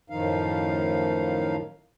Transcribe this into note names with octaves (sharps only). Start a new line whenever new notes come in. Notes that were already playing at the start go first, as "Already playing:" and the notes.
F#2 A2 D#3 F3 D#4 F5